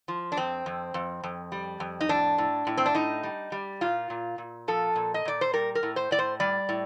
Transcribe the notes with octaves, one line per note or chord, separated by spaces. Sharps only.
F3
D4
F2 C4
F2
F2
F2
G3
F2
D#4
A2 D4
A2
A2
C4
D4
A2 D#4
G3
G3
A#2 F4
A#2
A#2
F3 A4
A#2
D#5
A#2 D5
C5
G3 A#4
A#4
A2
C5
A2 D5
C5
G3 D5
A2